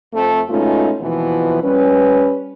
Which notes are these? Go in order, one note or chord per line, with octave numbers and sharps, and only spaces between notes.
F2 A3 C4
B2 G#3 A3 C#4 D#4 F4
D#2 B2 E3 F3 B3 E4
G3 C#4 B4